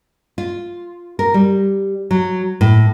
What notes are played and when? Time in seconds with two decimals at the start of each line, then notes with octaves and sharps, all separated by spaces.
0.38 F4
1.19 A#4
1.34 G3
2.11 F#3
2.61 A2